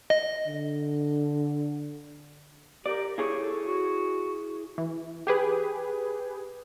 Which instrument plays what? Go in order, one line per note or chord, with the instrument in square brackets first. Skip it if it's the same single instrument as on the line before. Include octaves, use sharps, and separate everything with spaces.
[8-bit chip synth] D#5
[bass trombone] D3
[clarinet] G4 [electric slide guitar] A#4 D5
[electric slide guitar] E4 G#4 C#5
[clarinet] A4
F#4
[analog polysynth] E3
G4 G#4 B4